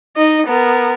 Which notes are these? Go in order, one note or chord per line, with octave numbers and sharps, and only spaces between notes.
D#4 D#5
B3 A#4